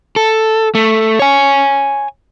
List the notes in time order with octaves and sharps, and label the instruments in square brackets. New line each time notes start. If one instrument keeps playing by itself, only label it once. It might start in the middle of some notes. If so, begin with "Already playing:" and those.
[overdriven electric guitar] A4
A3
C#5 G#5